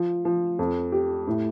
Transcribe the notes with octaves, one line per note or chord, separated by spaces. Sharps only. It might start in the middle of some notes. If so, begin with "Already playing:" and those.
Already playing: F3
F3
F2
G4
A2